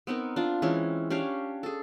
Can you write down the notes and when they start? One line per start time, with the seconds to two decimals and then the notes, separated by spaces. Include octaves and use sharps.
0.07 B3 C4 D#4 A#4
0.36 D4 F4
0.62 E3 G#3 C4 C#4
1.10 C#4 D4 G4 F5
1.63 G#4 A4